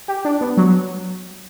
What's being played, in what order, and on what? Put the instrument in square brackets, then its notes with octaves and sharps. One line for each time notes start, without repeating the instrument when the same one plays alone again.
[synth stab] G4
D4
B3
F#3